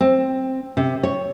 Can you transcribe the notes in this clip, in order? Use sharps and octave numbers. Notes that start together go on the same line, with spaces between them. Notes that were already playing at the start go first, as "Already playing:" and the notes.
C4
C3
C#5